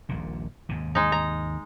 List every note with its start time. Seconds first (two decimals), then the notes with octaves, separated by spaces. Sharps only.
0.09 D#1 A#1 A#2
0.69 D#2 G#2 C3
0.95 G#3 D#4
1.12 A#5